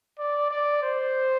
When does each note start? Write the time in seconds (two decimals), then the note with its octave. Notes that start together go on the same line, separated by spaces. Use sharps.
0.19 D5
0.51 D5
0.82 C5